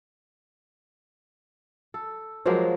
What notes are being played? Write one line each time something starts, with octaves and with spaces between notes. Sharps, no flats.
A4
F3 F#3 G#3 A#3